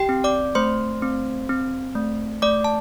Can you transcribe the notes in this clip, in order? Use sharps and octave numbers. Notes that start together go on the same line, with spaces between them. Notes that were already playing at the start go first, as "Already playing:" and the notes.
Already playing: G4 G5
C4
D5 D6
A3 C5 C6
C4
C4
A3
A3 D5 D6
A5